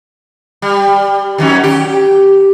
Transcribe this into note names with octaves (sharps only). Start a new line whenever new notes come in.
G3
D#3 F#3 C#4
G4